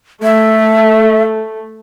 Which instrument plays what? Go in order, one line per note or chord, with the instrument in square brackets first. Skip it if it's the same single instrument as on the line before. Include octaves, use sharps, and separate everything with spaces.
[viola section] A3 [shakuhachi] E5